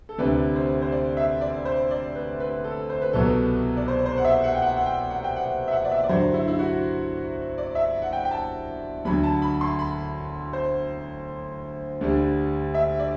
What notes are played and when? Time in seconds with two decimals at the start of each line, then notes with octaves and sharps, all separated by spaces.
0.09 A4
0.18 D2 C3 G3 D4 B4
0.56 C5
0.82 C5
0.92 D5
1.17 E5
1.41 D5
1.65 C5
1.91 D5
2.15 B4
2.40 B4
2.64 A4
2.89 C5
3.02 B4
3.13 C2 B2 F#3 B3 A4
3.26 B4
3.77 D5
3.88 C5
4.06 C5
4.18 F#5
4.25 E5
4.44 F#5
4.55 G5
4.62 F#5
4.77 F#5
4.86 G5
5.10 F#5
5.24 G5
5.36 F#5
5.68 E5
5.72 F#5
5.85 D5
5.91 E5
6.04 D5
6.09 G2 D3 F#3 C5
6.34 E4
6.48 E4
6.59 F#4
7.58 D5
7.75 E5
8.02 F#5
8.13 G5
8.25 G5
8.31 A5
9.05 D2 D3 F#3 B5
9.24 A5
9.42 B5
9.61 C6
9.79 B5
10.53 C5
12.01 D2 D3 G3 D4
12.74 E5
12.99 D5